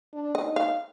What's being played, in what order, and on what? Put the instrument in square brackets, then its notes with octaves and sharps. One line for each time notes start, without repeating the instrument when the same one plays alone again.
[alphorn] D4
[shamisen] D#5
[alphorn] D#4
[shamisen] F5